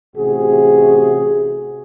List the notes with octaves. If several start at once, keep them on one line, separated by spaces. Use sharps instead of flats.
A1 C3 F#4 G#4